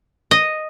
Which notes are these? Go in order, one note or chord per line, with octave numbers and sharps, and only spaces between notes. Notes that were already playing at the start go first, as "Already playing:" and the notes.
D#5